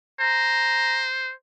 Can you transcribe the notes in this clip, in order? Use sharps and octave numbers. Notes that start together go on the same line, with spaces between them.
C5 A#5